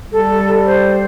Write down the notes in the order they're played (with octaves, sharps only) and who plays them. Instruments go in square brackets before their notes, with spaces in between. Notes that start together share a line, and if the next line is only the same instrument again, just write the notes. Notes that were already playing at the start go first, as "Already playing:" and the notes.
[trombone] G3 [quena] A4
[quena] C5